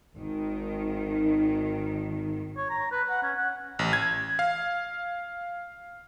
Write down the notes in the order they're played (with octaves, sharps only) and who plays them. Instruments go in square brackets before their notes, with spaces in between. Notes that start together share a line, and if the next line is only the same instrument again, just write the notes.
[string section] G#1 D#3
[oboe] C#5
A#5
B4
F#5
C#4
F#5
[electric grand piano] A1
G#6
F5